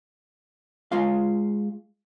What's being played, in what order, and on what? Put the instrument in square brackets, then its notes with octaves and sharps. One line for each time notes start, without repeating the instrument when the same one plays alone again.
[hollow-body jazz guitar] G#3 F4 F5